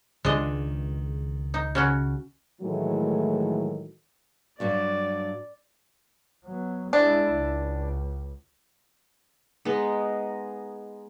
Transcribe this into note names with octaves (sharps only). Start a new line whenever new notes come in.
C#2 D#3 G#3 D4 D#5
D#4
C#3 C#4 F#4
A2 D#3 E3 F#3 G#3 A3
G2 F#3 G3 D5
F#3 B3
G#3 D4 E4
C#2
G#3 B3 D#4